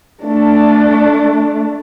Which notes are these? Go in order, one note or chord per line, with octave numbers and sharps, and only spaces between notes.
A3 D4